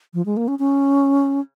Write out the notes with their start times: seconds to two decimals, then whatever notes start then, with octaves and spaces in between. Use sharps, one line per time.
0.14 F3
0.26 G#3
0.37 A#3
0.48 C#4
0.59 C#4